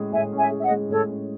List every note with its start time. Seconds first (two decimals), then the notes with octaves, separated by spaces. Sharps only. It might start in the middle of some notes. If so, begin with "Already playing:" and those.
Already playing: A2 G#3 C#4 G#4
0.12 A2 E5 G#5
0.32 C#4
0.38 E5 G#5
0.51 G#4
0.60 E5
0.64 D#5 F#5
0.71 G#3
0.89 A2 A4 C#5
1.09 C#4